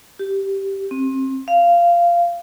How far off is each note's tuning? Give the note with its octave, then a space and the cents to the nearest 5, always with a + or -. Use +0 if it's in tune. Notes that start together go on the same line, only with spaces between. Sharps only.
G4 -5
C4 +30
F5 -15